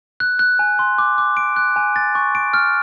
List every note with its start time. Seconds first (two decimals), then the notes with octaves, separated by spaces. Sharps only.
0.20 F#6
0.39 F#6
0.59 G#5
0.79 C6
0.98 D6
1.18 D6
1.37 D7
1.56 F#6
1.76 G#5
1.96 A6
2.15 C#6
2.35 D7
2.54 F6